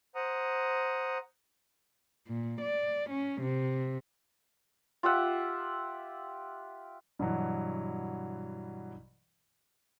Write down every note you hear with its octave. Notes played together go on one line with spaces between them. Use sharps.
C5 F#5 A#5 D#6
A#2
D5
C#4
C3
F4 G4 E5 F#5
G2 B2 E3 F#3